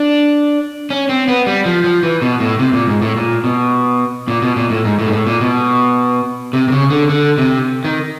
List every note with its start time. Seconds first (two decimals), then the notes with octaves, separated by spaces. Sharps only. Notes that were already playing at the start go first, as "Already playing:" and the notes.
Already playing: D4
0.90 C#4
1.09 C4
1.28 B3
1.47 G3
1.66 F3
1.84 F3
2.03 E3
2.22 B2
2.40 A2
2.59 C3
2.73 A#2
2.88 G#2
3.02 A2
3.16 A#2
3.44 B2
4.28 A#2
4.42 B2
4.56 A#2
4.70 A2
4.85 G#2
4.99 A2
5.06 G#2
5.13 A2
5.27 A#2
5.41 B2
6.53 C3
6.68 C3
6.72 C#3
6.91 D3
7.10 D3
7.38 C3
7.85 D#3